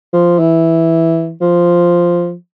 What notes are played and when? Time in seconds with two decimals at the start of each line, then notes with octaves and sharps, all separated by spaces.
0.13 F3
0.39 E3
1.41 F3